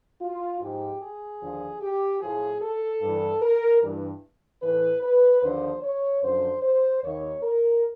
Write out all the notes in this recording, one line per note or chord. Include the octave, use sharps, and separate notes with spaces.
F4
G#2 F3 G4
G#4
D#2 D3 F3
G4
A2 F3 G#4
A4
G2 E3
A#4
G2 E3
A2 E3 B4
B4
D#2 D3 F3 C5
C#5
F#2 D3 F3 C5
C5
D#2 D#3 C#5
A#4